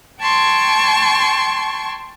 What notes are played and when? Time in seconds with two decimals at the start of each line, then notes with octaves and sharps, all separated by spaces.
0.21 G5 A5 C6 C#6 G#6